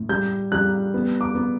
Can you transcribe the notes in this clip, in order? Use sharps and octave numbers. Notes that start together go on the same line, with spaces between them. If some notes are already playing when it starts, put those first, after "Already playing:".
Already playing: A2
G3 G6
G3 F#6
B3
D6
B3